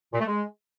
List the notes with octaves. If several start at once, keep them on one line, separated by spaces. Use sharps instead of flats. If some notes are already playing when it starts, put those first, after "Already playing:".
A#2
A3
G#3